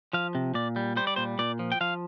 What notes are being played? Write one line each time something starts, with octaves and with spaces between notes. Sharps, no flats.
F3 F5
C3
A#2 D5
G3
G3 C5
D5
A#2 C5
A#2 D5
F3
G5
F3 F5